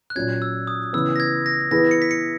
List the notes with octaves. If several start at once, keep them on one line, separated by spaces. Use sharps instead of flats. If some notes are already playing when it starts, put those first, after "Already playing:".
F#6
A#2 F#3 C#4 G#6
E6
D#6
C#3 E3 B3 E6
A#6
G#6
A#6
E3 B3 E4 G#4 B4 A#6
C#7
B6
C#7